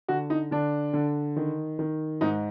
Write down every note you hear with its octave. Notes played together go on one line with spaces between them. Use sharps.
D3 F#4
D#4
D3 D4
D3
D#3
D#3
G#2 D#4